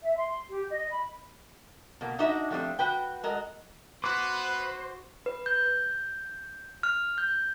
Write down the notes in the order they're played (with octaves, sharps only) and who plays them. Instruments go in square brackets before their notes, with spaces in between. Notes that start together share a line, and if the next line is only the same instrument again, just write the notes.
[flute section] E5
C6
G4
D#5
B5
[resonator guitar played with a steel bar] B2 A#3
D4 D#4 F#4 D#5 E5
F3 G3 A3 A#3 C4 D4
F#4 B4 G5
G#3 F#4 A4 A#4 D#5
[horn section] B3 B4 [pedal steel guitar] F#4 D6 [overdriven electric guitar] C5
[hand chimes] B4
G6
F6
G6